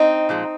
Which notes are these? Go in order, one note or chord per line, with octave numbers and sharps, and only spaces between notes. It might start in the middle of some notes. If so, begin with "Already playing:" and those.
Already playing: C4 D#4
A#2 F3 G#3